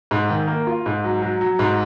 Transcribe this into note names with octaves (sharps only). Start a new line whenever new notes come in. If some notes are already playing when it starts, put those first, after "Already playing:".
G#2
D#3
A#3
F4
G#2
F#3
F#3
F#3
G#2